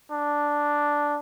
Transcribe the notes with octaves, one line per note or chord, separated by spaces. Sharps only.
D4